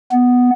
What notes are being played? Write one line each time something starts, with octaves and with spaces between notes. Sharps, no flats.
B3